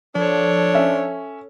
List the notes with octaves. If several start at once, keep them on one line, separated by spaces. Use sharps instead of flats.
F3 D4 A4 C#5
C#4 E5